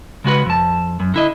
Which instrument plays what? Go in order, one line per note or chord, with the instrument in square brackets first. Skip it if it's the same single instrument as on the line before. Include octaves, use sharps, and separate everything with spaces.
[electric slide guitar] C#3 G#3 F#4 B4
F2 A5
F#2
D3 E4 D#5